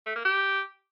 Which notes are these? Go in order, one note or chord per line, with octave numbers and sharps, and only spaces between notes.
A3
A#3
G4